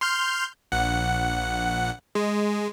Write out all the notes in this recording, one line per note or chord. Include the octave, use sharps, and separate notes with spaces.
C6 F6 G6
A#1 F#5
G#3